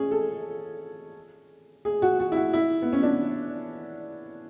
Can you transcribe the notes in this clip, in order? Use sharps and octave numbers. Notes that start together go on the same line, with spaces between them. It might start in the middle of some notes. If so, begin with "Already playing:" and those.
Already playing: C#4 G#4
A4
G#4
F#4
F#4
E4
F#4
E4
B3
C#4
D4